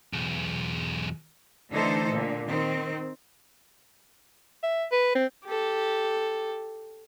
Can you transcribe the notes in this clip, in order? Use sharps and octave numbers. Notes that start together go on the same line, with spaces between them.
B1 E2
D3 E3 A3 D#4 A4 C5
A#2 D3
D#3 C4
E5
B4
C4
G4 A4